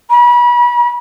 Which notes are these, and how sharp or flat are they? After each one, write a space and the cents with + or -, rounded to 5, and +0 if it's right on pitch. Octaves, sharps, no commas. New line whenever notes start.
B5 -35